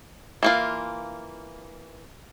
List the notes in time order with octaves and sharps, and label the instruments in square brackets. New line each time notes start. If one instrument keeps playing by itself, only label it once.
[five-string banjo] E3 A#3 F4